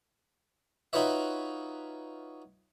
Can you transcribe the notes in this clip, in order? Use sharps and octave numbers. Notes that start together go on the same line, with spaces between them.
D#4 F4 F#4 B4 C#5 E5